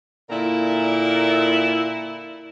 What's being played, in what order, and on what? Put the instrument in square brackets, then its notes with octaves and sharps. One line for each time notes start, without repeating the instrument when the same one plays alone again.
[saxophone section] A#2 D3 E4 A#4 E5